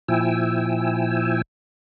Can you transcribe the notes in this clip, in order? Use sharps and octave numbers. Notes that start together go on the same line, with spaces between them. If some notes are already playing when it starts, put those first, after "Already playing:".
A#2 F3 E4 G5 G#5 E6